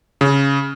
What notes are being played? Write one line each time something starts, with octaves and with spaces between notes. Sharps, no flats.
C#3